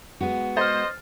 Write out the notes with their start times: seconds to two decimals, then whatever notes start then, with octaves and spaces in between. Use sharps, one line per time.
0.21 G#3 B3 F#4
0.57 C5 D#5 F6 A6